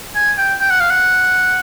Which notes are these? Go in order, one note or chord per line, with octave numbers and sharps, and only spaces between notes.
G#5
G5
G5
F#5
F5
F#5